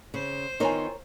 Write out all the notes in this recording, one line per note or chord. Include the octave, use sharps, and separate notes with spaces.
C#3 C5
D#3 B3 C4 D#4 F4 A#4 C#5 G#5